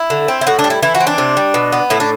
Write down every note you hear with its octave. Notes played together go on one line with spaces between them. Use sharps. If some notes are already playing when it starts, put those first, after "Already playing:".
Already playing: E4
D3
C4
E4
A2 F#4
D4
G3
E4
E3 E4
F#4
C4
D4
C3
G3
B2
B3
A2 E4
D4